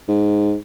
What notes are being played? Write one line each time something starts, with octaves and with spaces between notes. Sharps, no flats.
G#2